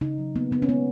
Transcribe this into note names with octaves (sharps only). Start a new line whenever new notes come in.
C#3 D#4
F#3
A#3 B3
C#3 B3
C#4
G#3 B3